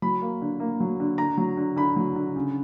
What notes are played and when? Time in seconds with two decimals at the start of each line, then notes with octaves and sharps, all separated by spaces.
0.02 F#3 B5
0.22 A#3
0.42 D3
0.60 A#3
0.80 F#3
1.00 D3
1.18 D3 A#5
1.38 F#3
1.57 D3
1.76 D3 B5
1.96 F#3
2.16 D3
2.36 C#3